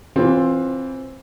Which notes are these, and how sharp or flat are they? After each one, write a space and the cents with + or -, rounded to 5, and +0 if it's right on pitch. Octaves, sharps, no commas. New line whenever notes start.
E3 +0 C4 +20 F4 +10